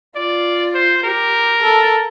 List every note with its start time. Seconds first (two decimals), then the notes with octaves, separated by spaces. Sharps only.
0.16 F4 D5
0.74 C5
1.03 G4 A#4
1.62 A4